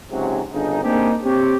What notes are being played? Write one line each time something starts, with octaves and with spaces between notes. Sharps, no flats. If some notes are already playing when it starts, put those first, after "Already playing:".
C#2 G#2 C3 F#3
G1 C#3 D4 D#4
A#3 C4 D4 D#4 G4 G#4
C4 G4 C#5